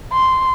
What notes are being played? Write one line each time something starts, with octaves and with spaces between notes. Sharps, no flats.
C6